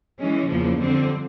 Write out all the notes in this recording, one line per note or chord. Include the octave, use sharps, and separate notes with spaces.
E3 G#3 C#4
E2 C#3 F3 A#3
F2 D3 G3 C4